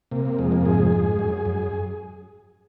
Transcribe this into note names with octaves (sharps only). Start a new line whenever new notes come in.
C3 A#3
A#3
F2 G#3
A#3
G#2 G#4
G#2
F#2
F#2